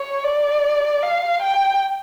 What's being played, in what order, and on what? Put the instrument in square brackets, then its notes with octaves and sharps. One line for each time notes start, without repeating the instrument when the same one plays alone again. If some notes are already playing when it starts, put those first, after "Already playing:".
Already playing: [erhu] C#5
D5
F5
G5